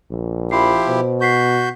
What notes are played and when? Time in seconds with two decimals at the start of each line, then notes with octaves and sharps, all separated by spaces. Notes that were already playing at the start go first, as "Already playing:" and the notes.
0.11 A#1
0.51 F3 E4 G4 B5 C6 C7
0.87 B2 C5
1.21 F#4 C#6 G6 B6 C7